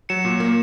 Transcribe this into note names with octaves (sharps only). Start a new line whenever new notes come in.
F#3 C#7 E7
A#2
A#3